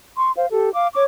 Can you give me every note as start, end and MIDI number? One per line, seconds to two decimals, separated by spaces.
0.17 0.30 84
0.17 0.30 85
0.36 0.47 72
0.36 0.47 77
0.50 0.72 67
0.50 0.72 69
0.72 0.87 77
0.72 0.87 86
0.94 1.04 73
0.94 1.04 85
0.94 1.04 86